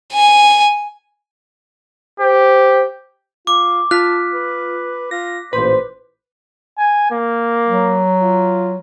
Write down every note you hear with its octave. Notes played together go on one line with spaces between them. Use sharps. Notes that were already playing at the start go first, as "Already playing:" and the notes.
G#5
G4 C5
F4 D6
F4 A5 F#6 B6
B4
F4 A#6
A1 A#2 A3 B4 C5
G#5
A#3
F#3
F4